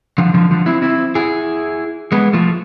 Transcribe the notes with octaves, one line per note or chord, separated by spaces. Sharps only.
D3 F3
D3 F3
D3 F3
C4 E4
C4 E4
E4 G#4
G#3 B3
F3 A3